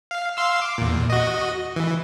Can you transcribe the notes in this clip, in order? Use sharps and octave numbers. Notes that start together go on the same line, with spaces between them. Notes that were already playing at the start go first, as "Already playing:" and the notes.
F5
F5 C6 E6
D6
E2 A#2
F#4 D#5
E3